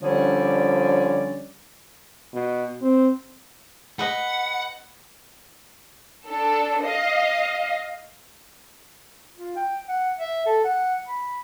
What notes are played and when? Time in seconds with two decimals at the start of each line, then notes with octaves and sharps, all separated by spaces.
0.03 D3 F3 G3 C#4 D5
2.33 B2
2.81 C4
3.99 B4 D#5 F#5
6.27 D4 A4
6.83 D#5 F5
9.37 F4
9.56 G5
9.89 F#5
10.19 E5
10.46 A4
10.64 F#5
11.07 B5